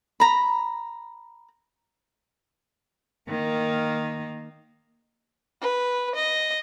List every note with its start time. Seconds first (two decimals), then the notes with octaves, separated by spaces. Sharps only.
0.20 A#5 B5
3.29 D#3 A#3
5.61 B4
6.15 D#5